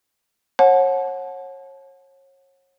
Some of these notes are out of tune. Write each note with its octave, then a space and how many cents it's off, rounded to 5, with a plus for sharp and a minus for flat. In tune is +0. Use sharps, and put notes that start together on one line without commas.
C#5 -35 F#5 -15 A5 -30